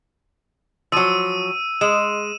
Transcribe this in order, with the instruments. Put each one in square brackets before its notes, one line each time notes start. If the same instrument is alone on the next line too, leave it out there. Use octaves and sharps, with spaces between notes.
[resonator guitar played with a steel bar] F3 F#3 [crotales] E6 D#7
[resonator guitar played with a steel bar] G#3 [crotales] E7